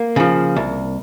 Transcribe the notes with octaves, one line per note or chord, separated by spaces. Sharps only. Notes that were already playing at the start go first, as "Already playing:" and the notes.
Already playing: A#3
C#3 F3
C2